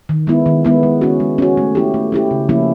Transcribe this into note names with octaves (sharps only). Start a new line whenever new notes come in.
D#3
G#3 B3 E4
D#3
G#3 B3 E4
G#3
C#4 F#4
G#3
C#4 F#4
A3
C#4 E4 G4
A3
C#4 E4 G4
C#3
F3 A#3 C#4 E4